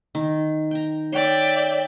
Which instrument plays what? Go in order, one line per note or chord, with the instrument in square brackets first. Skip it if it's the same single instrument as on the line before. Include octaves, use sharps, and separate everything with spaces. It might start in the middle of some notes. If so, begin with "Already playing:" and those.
[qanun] D#3
G5 A#5
[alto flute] C#5 [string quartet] D5 E5 G5 [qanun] C6